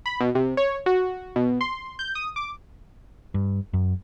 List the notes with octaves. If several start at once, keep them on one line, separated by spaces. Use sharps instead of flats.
B5
B2
C3
C#5
F#4
B2
C6
G6
D#6
D6
G2
F#2